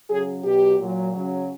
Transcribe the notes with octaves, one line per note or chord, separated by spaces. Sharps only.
C#3 F#3 G#4
B2 F#3 G4
A#2 F#3
C#3 F#3